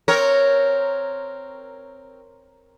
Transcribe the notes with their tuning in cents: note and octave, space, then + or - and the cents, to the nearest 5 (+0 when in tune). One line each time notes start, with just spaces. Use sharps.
C4 +0 A#4 -5 C#5 +0